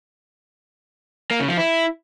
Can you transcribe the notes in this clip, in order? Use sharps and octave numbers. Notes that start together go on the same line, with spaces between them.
A#3
C#3
F3
E4